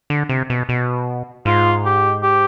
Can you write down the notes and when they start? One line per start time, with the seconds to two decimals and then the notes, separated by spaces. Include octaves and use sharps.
0.10 D3
0.29 C3
0.50 B2
0.69 B2
1.45 G#2 F4
1.85 G4
2.23 G4